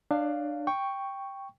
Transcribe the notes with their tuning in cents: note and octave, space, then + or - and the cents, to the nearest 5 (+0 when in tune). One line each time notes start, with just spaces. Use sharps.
D4 +25 C#5 +45 F5 +0
G5 +5 C#6 +0